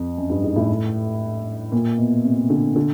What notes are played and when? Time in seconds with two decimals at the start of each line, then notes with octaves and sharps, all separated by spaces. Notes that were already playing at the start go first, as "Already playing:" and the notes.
Already playing: F2
0.17 F#2
0.30 G2
0.43 G#2
0.56 A2
1.72 A#2
1.98 B2
2.24 C3
2.50 D3
2.76 D3